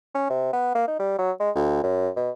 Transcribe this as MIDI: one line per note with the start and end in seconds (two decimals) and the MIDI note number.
0.15 0.27 61
0.30 0.50 48
0.53 0.71 59
0.75 0.86 58
0.88 0.96 63
1.00 1.17 55
1.19 1.32 54
1.40 1.51 56
1.56 1.80 38
1.83 2.09 42
2.17 2.31 47